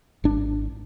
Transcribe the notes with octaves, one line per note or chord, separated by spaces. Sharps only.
G#1 D4